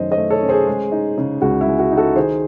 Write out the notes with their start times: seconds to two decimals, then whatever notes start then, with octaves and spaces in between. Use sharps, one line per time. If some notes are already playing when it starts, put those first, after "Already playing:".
Already playing: F#2 D#3 A3 C#4 C5 D#5
0.11 C5 D#5
0.17 A3
0.30 A4 C#5
0.43 C#4
0.49 G#4 C5
0.67 G#3
0.92 D#4
1.18 C#3
1.42 C#2 F#4
1.61 E4
1.67 G#3
1.79 F#4
1.92 D#4
1.97 F#4 A4
2.16 D#3 G#4 C5